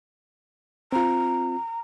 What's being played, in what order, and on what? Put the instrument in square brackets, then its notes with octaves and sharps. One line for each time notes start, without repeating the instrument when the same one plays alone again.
[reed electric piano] C4 F4 [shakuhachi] A#5